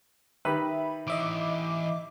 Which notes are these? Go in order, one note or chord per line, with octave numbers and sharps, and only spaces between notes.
D#3 G4 B4 E5 B5
E3 C#5 D#5 E5 D6